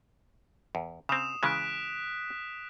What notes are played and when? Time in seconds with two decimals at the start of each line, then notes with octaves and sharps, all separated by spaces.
0.75 E2
1.09 C#3 C4 D#6 E7
1.43 C#3 E3 G#3 F#6 B6 D7